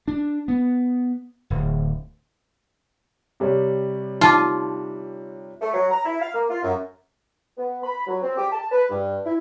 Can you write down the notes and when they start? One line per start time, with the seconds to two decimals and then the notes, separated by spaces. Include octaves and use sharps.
0.08 D4
0.48 B3
1.50 D1
3.40 C3 G3 C#5
4.21 D#4 F4 A5 D6
5.61 A3
5.73 F#3
5.91 A#5
6.05 E4
6.22 F5
6.34 A#3
6.50 F4
6.63 F#2
7.57 B3
7.84 B5
8.07 F#3
8.22 C4
8.37 G4
8.52 A5
8.72 B4
8.90 G2
9.25 E4